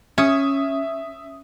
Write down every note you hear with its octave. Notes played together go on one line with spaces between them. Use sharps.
C#4 E5 D#6